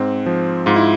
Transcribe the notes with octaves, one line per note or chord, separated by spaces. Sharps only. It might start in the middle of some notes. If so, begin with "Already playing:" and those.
Already playing: G#2 C4
F3
G#2 F4
E4